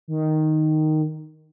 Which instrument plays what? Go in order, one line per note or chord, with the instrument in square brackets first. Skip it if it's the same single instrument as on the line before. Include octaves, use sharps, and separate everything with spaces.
[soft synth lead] D#3